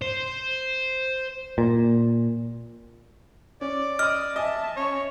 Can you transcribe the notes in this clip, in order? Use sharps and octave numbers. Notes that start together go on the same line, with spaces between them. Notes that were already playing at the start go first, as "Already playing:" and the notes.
C5
A#2
C#4 D5
D#5 D#6 F6
D#5 E5 G#5 A5
C#4 C#5